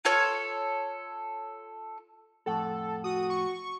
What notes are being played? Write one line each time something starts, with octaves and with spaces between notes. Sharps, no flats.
F4 A4 C#5
F2 A2 A4 F#5
F#4 D#6
C#6